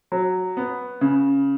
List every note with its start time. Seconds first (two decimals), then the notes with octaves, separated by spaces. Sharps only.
0.12 F#3
0.57 B3
1.01 C#3